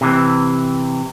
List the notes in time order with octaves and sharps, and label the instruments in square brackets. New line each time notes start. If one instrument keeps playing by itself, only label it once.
[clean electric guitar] C3 E3